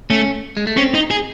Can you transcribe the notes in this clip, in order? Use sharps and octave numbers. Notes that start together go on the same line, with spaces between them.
A3 C#4
G#3
A3
C4 C#4
D#4
G#4